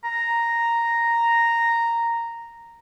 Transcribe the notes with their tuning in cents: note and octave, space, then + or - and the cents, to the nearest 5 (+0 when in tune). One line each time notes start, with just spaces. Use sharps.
A#5 -5